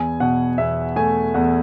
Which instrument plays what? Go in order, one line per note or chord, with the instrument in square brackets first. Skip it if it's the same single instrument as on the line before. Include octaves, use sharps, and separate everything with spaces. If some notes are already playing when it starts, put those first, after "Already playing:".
Already playing: [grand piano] E2 G#5
B2 F#5
E2 E5
A3 G#5
E2 F#5